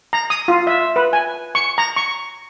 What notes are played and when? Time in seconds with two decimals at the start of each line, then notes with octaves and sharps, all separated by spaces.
0.13 A#5
0.30 D#6
0.48 F4
0.67 E5
0.96 B4
1.13 G#5
1.55 C#6
1.78 A#5
1.96 C#6